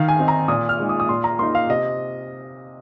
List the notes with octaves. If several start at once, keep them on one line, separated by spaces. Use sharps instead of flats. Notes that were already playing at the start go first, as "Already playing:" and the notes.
Already playing: D#3 F5
G#5
C4 D#4
A#5
A#2 D#6
F6
G#3 D#4
D#6
D#6
A#2 C6
A#5
A#3 D#4 C6
F5
C3 D#5